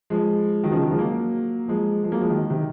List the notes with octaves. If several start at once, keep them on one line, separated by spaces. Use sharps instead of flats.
F3 G#3
D#3 F#3
C#3 F3
D#3 F#3
F3 G#3
F#3 A#3
F3 G#3
F3 G#3
F#3 A#3
F3 G#3
D#3 F#3
C3 D#3